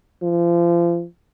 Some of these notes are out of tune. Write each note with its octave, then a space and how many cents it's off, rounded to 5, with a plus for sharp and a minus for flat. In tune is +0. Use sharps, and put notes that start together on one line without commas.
F3 -35